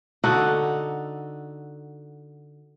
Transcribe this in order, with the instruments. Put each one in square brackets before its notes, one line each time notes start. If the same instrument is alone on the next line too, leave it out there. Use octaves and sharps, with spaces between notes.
[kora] D3 D#4 F#4 A4